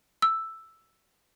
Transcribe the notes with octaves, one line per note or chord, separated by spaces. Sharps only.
E6